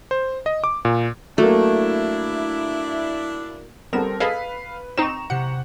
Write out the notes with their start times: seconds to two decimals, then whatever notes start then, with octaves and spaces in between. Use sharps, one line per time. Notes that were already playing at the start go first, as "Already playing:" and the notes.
0.11 C5
0.46 D#5
0.64 D6
0.85 A#2
1.38 F#3 A3 A#3 D4 E4
3.93 G3 B3 C4 A4 A#4 E7
4.20 G#4 A4 B4 D#5 F5 B6
4.98 C4 D#4 A#5 C#6 E7
5.30 C3 G4 F#5 C#7